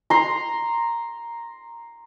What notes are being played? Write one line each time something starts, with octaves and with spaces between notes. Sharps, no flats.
A#5 C6